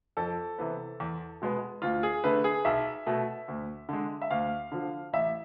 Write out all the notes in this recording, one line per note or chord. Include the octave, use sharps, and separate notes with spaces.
F2 A4
C3 E3 B3
E2
B2 G#3 B3
D2 F4
G#4
D3 A3 B4
G#4
B1 E5
B2 A3
D2
D3 G#3
E5
D2 F5
D3 F3
A1 E5